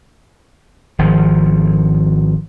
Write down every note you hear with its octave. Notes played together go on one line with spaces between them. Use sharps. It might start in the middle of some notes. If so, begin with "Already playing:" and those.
G#1 F3